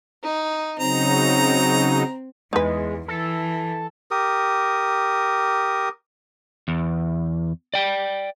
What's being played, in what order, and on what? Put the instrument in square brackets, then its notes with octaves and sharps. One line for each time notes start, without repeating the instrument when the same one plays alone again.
[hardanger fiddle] D#4
[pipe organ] C#3 F#3 D#4 [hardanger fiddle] C4 [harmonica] A#5
[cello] E2 [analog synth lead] G#3 [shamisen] D#4 B4
[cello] E3 [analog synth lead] A4
[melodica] G4 A#4 D#6
[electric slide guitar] E2
D5 G5